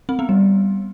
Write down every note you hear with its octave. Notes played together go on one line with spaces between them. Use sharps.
C4
B3
G3